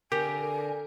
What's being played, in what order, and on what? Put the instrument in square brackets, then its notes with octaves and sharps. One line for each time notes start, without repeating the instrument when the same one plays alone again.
[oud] D3 [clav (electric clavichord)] G4 [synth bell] A#4 [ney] G#5